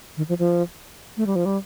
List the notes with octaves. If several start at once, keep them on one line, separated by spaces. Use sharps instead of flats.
D#3
F3
F3
A3
G3
F3
G3